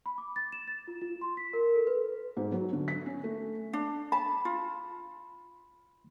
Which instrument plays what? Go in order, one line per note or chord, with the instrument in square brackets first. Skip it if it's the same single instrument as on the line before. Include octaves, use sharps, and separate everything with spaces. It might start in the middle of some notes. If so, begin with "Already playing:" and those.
[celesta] B5
D6
A6
E7
A6
F4
F4
C6
B6
A#4
A4
B4
[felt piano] G#2
F#3
D3
B6
C#4
A3
[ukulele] D4
[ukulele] A5 [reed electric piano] B5
[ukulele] F4